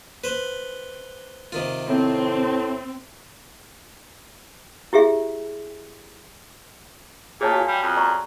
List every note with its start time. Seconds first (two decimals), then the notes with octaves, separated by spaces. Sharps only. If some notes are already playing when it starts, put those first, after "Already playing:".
0.24 B4 C5
1.52 C3 D#3 F4
1.89 A2 C4
4.93 E4 G4 G#4 E5
7.41 A#2 G#4 C#5 A5
7.52 F#4 F5 G#5
7.68 G3
7.82 F2
7.97 D5 A#5 C#6